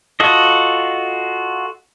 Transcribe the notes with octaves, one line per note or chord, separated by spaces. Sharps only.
F4 F#4 A4 D#5